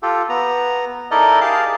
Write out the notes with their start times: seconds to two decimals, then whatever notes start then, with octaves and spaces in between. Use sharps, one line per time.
0.03 F4 G4 A4
0.29 B3 A#5
1.11 D#4 E4 A4 A#4 D5 D#5
1.41 G4 G#4 A#4 F5 A5